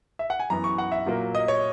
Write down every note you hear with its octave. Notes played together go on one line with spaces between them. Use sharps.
E5
F#5
G#5
F#2 E3 B3 A#5
C#6
F#5
E5
A#2 F#3 A#3
D#5
C#5